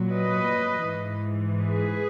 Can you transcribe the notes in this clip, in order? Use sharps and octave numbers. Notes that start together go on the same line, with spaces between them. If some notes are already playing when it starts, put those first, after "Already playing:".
Already playing: A#2 F#3
B4 D#5
G#2 E3
G#4 B4